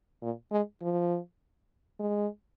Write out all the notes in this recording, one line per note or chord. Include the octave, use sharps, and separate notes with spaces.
A#2
G#3
F3
G#3